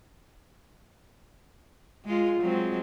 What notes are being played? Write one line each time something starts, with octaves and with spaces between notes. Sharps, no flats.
G#3 F4
F#3 G#3 C4